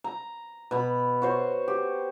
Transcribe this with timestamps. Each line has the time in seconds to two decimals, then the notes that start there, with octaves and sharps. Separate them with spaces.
0.04 A#5
0.71 B2 B5
1.22 F#4 C5 C#5
1.68 G4